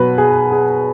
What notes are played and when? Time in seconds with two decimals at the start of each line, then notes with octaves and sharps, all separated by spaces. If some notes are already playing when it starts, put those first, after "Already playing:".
Already playing: B2 F#3 B4
0.18 G#4
0.52 G#4